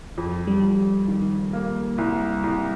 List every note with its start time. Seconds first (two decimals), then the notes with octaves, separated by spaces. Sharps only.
0.18 F2
0.47 G3
0.63 F2
1.08 D#3
1.53 A#3
1.98 C2
2.44 C2